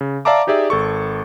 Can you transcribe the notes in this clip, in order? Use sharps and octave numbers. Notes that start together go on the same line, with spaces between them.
C#3
D5 E5 F5 A5 A#5 D6
D#4 G4 G#4 D5 E5
G#1 A4 C#6